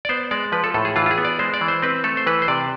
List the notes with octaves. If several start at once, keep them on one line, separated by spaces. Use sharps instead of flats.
D5
B3 C5
G#3 D5
F3 B4
A4
A2 A4
G#4
E3 F4
F4
G#4
B3
D5
G#3 C5
D5
E3
C5
C4 B4
A3 A4
C5
E3 B4
C5
C3 D5